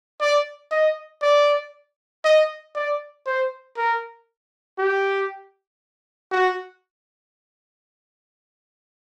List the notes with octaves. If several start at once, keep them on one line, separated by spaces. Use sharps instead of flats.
D5
D#5
D5
D#5
D5
C5
A#4
G4
F#4